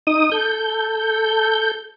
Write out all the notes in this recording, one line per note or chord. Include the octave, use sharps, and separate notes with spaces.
D#4 D#6
A4 G6